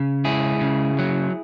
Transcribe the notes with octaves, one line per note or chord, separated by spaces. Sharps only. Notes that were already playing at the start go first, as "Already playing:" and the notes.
Already playing: C#3
C#2 E4 G#4
C#3
F#3